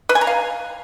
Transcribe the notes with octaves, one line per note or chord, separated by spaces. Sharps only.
B4
G#5
A#5
F5